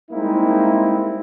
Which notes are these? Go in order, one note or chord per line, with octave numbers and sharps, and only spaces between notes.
G3 G#3 A#3 C4 D#4 E4